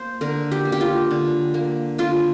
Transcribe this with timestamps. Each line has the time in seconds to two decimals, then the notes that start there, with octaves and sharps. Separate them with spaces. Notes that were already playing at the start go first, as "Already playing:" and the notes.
Already playing: A#3 C5
0.21 D3 A#4
0.52 G4
0.65 A#3
0.72 G4
0.81 F4
1.11 D3
1.54 A#3
1.98 D3 F4